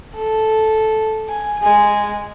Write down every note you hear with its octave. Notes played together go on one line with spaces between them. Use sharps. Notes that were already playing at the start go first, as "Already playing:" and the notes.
A4
G#5
G#3 G#5